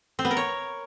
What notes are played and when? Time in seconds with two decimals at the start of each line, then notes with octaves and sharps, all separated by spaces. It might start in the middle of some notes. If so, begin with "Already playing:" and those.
0.19 C4
0.25 B3
0.31 A#4
0.37 C#5